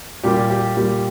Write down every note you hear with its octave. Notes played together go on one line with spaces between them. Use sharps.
A#2 G3 A#3 G4
G4
A#2 G3 A#3 G4